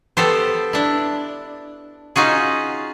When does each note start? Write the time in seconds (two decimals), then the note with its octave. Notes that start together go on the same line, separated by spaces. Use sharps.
0.17 B3 G4 A4 C5
0.73 D4 E4
2.16 C#4 D#4 F4 F#4 G#4